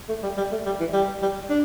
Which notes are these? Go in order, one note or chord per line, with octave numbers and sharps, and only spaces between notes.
A3
G3
G3
A3
G3
E3
G3
G3
D4